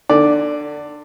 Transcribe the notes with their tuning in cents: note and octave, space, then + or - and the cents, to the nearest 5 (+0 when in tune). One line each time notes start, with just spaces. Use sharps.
D3 +25 D5 +0